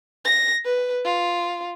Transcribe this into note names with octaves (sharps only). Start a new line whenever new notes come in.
A#6
B4
F4